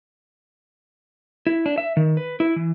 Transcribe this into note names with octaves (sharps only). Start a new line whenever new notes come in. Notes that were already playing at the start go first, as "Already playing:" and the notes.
E4
D4
E5
D#3
B4
E4
E3